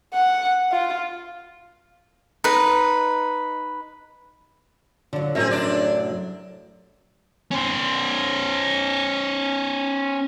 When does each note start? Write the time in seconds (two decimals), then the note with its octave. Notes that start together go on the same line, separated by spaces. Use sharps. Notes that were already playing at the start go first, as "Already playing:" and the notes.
0.14 F#5
0.72 F4
2.44 D#4 B4
5.13 A#2 D3 F#3
5.35 F#2 A2 C3 F#3 C4 G#4 A#4 E5
5.51 D4 D5
7.51 C#4 C5